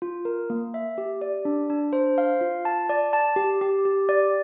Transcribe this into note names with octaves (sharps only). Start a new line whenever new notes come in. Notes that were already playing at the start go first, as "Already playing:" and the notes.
F4
A#4
A#3
E5
G4
D5
D4
D4
C5
F5
F4
A5
D5
A5
G4
G4
G4
D5